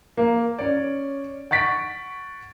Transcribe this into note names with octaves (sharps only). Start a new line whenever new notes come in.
A#3
C#4 C#5 D5
F#5 C#6 A6 B6 D7